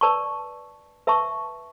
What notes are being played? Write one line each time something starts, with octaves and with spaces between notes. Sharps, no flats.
B4 D5 A5 C#6
B4 E5 A5 C#6